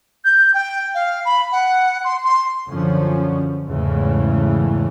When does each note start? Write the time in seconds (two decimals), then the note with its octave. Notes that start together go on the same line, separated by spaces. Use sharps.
0.25 G6
0.54 G5
0.95 F5
1.25 B5
1.52 F#5
2.04 C6
2.24 C6
2.70 F#2 D3 F3 C#4
3.68 E2 G#2 C#3 E3 A3